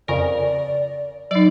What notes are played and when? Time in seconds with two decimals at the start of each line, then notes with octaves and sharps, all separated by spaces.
0.08 F2 C#3 A#4 D5
1.31 F#3 D#4 D5